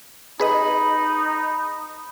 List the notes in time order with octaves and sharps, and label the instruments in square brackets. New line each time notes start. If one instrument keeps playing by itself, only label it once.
[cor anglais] D#4 [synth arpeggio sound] G#4 B4 D#5 [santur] B5